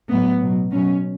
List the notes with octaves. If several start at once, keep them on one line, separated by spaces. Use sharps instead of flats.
A2 F#3 B3
B2 F#3
B2 F#3 C#4